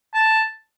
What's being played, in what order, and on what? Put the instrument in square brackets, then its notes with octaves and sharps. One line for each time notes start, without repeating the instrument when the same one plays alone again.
[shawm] A5